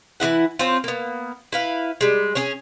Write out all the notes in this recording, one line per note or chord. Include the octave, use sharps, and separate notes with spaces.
E3 D#4 E4 F#5
C4 C#4 F4
A#3 B3
E4 B4 F5
G3 G#3
C#4 G#4 C#5